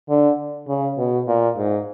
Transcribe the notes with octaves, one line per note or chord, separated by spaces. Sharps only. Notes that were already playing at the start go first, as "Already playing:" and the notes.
D3
C#3
B2
A#2
G#2